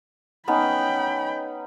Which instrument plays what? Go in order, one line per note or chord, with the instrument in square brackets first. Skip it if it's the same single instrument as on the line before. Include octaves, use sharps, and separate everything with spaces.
[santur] B3 C#4 D#4 [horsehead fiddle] G5 B5